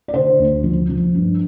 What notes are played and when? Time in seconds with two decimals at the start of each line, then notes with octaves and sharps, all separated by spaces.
0.08 D5
0.14 D3 C5
0.39 D2
0.64 F3
0.89 F3
1.15 G2